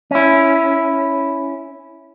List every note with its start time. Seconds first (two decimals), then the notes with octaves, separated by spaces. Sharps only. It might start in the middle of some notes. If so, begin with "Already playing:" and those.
0.11 C#4 E4